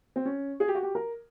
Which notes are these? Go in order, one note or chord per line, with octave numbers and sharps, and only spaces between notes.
C4
C#4
G#4
G4
F#4
G4
A#4